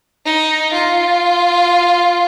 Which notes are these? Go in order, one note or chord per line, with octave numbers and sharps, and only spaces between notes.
D#4
F4